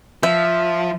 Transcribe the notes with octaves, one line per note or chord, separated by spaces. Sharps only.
F3 E5